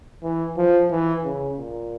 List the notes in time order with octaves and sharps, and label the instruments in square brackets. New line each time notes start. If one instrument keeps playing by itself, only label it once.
[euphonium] E3
F3
E3
C#3
A#2